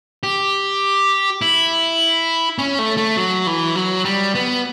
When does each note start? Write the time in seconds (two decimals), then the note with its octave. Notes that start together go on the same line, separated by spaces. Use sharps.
0.23 G4
1.42 E4
2.58 C#4
2.79 A3
2.97 A3
3.17 F#3
3.47 E3
3.76 F#3
4.05 G3
4.35 B3